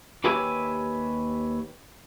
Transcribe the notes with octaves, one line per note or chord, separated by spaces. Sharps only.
D#2 G4 B4 C#5 E5 G#5